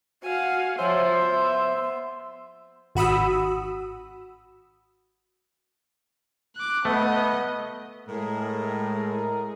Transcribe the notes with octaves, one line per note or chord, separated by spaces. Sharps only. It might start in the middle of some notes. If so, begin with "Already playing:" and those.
F#4 F5 F#5 G#5
F3 C5 C#5 E5
B3 C6
G#1 F#4 B5 D#6 E6
D6 F#6
A3 B3 D#5
A2 G#3 G#4 A#4